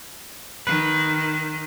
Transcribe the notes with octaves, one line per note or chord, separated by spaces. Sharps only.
D#3 B4